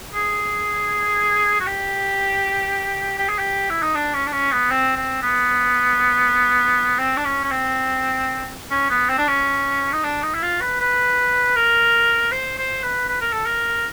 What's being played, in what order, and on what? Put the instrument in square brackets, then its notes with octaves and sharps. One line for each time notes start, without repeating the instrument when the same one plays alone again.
[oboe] G#4
F#4
G4
G4
G#4
G4
E4
D#4
D4
C#4
D4
C#4
B3
C4
C4
B3
C4
D4
C#4
C#4
C4
C#4
B3
C4
D4
C#4
D#4
D4
D#4
E4
F4
B4
B4
A#4
C5
C5
B4
B4
A#4
A4
A#4